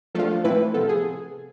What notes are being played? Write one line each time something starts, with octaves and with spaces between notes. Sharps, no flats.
F3 A3 D4 F4 A4
A2 E3 A3 C4 E4 B4
C3 F3 B3 A4
G#4